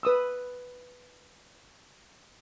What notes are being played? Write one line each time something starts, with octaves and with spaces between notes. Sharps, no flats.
B4 D#6 E6